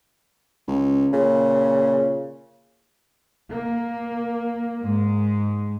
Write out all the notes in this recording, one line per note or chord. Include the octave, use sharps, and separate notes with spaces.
C#2
A#2 C#3
A#3
G#2 G#3